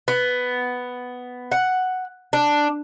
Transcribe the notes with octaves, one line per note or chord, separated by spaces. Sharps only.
B3
F#5
D4